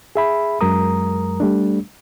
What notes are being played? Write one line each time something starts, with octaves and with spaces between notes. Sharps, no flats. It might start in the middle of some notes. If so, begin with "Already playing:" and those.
G#4 E5 B5
F#2 F#3 G#3 A#4 A#5 D#6
G3 A3 D4